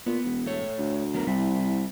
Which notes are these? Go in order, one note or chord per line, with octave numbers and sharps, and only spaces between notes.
A#2 B3
E1
A3 C#5
D2
F#3 B3 A#4
C2 G3 E4